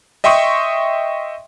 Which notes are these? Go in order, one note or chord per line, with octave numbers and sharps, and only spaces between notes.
D#5 E5 G5 C6 C#6 D#6